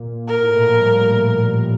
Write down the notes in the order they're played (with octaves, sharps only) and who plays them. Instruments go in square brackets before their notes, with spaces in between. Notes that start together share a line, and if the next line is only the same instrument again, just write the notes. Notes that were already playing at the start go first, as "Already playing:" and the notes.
Already playing: [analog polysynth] A#2
[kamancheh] A#4
[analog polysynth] A2
A#2
F3
G3